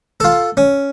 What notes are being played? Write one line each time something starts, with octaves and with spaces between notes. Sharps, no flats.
F4 A4
C#4